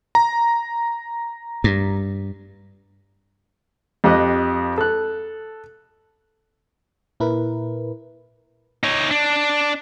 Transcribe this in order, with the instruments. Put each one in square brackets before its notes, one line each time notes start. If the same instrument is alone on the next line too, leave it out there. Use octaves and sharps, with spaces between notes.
[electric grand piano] A#5
[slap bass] G2
[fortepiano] F2 G4 D#5 D#6 F#6
A4 F#6
[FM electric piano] A#2 E4 A#4 B4
[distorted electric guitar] D#4 C#5
D4